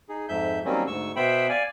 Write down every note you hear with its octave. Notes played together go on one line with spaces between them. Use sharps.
D#4 G#4
F2 G#2 E5 G6
D#3 F#3 G3 A#3 C4 C#4
D2 G#2 C#6 E6
B2 B3 C5 E5 G5 B5
D5 F5 G#5